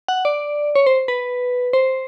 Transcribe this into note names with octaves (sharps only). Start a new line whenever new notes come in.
F#5
D5
C#5
C5
B4
C5